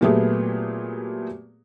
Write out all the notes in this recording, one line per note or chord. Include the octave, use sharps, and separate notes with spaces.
A#2 F#3 A3 B3 G4 G#4